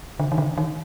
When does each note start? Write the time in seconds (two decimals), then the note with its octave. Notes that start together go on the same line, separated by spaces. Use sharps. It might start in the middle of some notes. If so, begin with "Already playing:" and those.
0.20 D3
0.32 D#3
0.38 D3
0.57 D#3